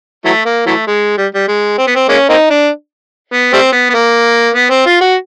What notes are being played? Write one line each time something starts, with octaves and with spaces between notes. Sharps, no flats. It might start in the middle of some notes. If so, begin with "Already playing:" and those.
E3 F#3 A3
A#3
E3 F#3 A3
G#3
G3
G3
G#3
C4
B3
C4
G#3 A#3 C#4
A#3 C4 D#4
D4
B3
G3 A3 C4
B3
B3
A#3
B3
C4
F4
F#4